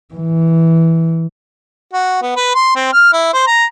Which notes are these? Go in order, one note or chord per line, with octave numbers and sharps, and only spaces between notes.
E3
F#4
B3
B4
C6
C4
F6
E4
C5
A#5